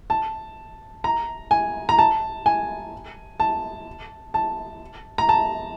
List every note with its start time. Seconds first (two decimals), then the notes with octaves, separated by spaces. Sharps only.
0.10 A5
1.04 A#5
1.51 G#5
1.89 A#5
1.98 A5
2.46 G#5
3.40 A5
4.34 A5
5.18 A#5
5.29 A5